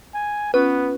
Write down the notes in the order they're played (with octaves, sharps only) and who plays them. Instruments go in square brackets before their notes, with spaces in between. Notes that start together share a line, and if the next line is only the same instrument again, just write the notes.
[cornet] G#5
[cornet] B3 [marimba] C#4 F4 C#6 [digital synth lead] B4